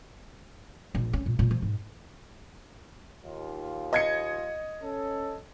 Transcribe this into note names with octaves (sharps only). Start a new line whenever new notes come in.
A#1
C#4
A#2
A#2
F3
G#2
D#2 F4
D#5 G#6 C#7
C#4 A4